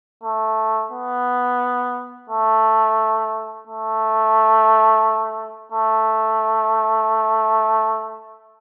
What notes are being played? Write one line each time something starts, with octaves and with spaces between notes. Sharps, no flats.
A3
B3
A3
A3
A3